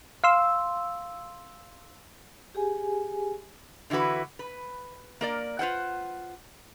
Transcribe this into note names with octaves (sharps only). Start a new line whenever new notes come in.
F5 C6 E6
G4 G#4 G#5
D3 E3 E4 F#4 B4
B4
A#3 A#4 D5
F4 B4 C5 F#5